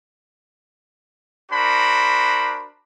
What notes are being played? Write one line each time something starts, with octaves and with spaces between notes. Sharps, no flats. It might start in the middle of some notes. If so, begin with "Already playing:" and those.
D4 F#4 A#4 C5 B5